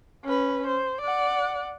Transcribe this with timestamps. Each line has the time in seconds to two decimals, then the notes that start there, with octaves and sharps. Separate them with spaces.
0.25 C#4 B4
0.67 C5
1.01 D5 F#5